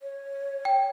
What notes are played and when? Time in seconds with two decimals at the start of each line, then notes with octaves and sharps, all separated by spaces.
0.02 C#5
0.65 G5